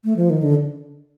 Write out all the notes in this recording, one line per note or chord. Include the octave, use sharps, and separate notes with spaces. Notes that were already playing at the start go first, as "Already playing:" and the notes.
A3
F3
D#3
D3